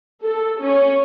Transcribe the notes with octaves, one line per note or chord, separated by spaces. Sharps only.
A4
C#4